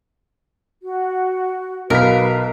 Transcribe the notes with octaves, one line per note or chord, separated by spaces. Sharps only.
F#4
B1 A#4 B4 F5 B6